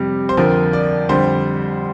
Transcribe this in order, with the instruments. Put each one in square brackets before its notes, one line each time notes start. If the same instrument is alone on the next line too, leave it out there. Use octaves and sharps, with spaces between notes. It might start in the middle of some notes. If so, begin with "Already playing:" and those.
Already playing: [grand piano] F2 C3 G3
C5
F2 D3 F3 A#4
D5
F2 D3 G3 C5